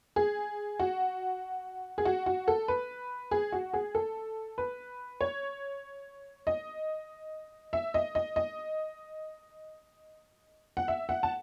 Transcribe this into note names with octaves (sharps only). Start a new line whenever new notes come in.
G#4
F#4
G#4
F#4
F#4
A4
B4
G#4
F#4
G#4
A4
B4
C#5
D#5
E5
D#5
D#5
D#5
F#5
E5
F#5
A5